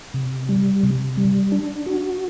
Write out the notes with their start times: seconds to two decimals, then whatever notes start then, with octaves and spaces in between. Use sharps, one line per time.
0.14 C3
0.49 G3
0.83 C3
1.17 G3
1.52 D4
1.86 F#4